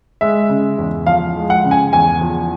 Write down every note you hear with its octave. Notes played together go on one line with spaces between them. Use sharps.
G#3 E5
C#3
E2
F3 F5
G#3
F#5
C#3
G#5
E2 G#5
F3